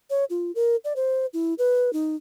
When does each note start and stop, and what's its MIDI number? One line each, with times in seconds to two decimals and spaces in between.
0.10 0.24 73
0.30 0.51 65
0.55 0.76 70
0.84 0.93 74
0.96 1.26 72
1.33 1.54 64
1.58 1.93 71
1.93 2.16 63